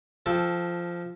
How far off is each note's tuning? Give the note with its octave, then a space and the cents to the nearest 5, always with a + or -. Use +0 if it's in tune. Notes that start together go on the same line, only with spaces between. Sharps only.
F3 -10 A4 -5 G5 +20